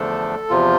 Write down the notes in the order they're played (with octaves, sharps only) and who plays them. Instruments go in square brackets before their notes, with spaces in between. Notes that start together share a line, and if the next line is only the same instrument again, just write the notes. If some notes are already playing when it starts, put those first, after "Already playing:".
Already playing: [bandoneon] E2 D3 F3 A3 D4 A4
E2 C3 F3 F4